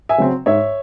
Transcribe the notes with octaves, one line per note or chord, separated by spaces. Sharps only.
E5 G#5
C#3 F#3 C4
G#2 C#5 E5